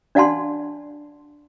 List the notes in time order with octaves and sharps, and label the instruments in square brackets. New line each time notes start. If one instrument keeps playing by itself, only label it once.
[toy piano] D4 D5 F5 F#5 A5 C6